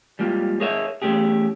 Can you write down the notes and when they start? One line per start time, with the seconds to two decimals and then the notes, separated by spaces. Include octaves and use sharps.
0.19 G3 G#3 A#3 F4
0.60 G#4 A#4 C#5 D#5 E5
1.02 E2 G#2 A3 C#4 G4 G#4